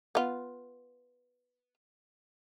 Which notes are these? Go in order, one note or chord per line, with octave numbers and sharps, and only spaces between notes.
B3 F4